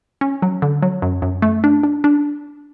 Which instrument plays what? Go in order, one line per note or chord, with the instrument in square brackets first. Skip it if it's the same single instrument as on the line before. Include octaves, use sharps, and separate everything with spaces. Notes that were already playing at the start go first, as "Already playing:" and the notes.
[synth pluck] C#4
F#3
D3
F#3
F#2
F#2
A3
D4
D4
D4